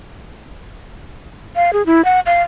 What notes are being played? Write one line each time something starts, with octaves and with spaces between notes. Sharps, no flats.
F5
G#4
E4
F#5
F5